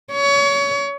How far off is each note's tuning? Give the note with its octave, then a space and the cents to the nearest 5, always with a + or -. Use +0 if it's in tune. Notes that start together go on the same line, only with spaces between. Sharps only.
C#5 +25